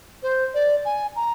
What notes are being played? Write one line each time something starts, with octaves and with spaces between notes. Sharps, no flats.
C5
D5
G#5
A#5